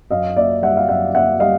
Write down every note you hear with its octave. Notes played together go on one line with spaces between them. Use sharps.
F#2 D#5 F5
A#3 D5 E5
G3 E5 F#5
F5
F#2 E5 F#5
A#3 E5 F#5
G3 D#5 F5